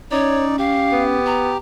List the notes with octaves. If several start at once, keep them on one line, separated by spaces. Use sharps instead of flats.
C#4 D#4 C#5 D5
G4 F5
B3
A#5